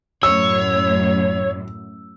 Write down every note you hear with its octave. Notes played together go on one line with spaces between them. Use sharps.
F#2 A2 C#5 E6